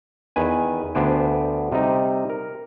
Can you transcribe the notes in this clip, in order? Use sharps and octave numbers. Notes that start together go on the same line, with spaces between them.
E2 D#3 B4 G#5
D2 B3 D4 C5 G5 G#5
C3 G3 C4 D#4
A#4